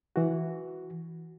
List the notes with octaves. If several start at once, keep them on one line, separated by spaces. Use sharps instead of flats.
E3 F#4